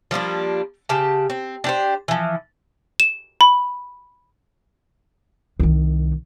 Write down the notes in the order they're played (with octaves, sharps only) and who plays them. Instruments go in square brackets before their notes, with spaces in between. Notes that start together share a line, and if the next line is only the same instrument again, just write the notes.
[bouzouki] F3 G3 A#3 D4
C#3 G4 A5
C4
D4 G4 C5
E3 F3
[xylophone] E7
B5
[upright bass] C2 D#3